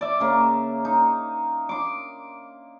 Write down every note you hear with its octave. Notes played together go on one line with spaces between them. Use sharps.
D5 E5
C#3 A#3
D#4
C6 D6